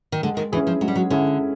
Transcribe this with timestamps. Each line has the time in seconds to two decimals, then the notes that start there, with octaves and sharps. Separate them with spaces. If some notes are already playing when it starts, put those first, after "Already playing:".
0.12 D#3
0.22 D3 G#3
0.37 D#3
0.52 E3 C#4 E4 G#4
0.67 F3
0.81 F#3 G#3
0.88 G3
0.96 F#3
1.10 D3 C#4 E4 G#4